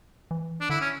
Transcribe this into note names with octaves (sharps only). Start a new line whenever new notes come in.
E3
D4
D3 E4
C#4